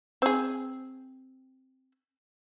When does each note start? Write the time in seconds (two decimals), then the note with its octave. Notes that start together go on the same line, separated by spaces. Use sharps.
0.22 C4 G#4